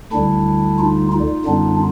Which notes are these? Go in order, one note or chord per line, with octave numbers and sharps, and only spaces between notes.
D2 D3 G3 D4 E4
D#4 F4
D#4 F4
F#2 D3 G3 B3 D4